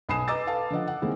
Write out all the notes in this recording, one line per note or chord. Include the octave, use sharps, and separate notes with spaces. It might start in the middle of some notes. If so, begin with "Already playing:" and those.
B1 G#5 B5 D#6 C7 E7
B4 D#5 A#5 D6 E6 A6
A4 B4 F5 A5
D3 F3 D#5 F#5
F#5
D#3 G#3 A#3 C4 E4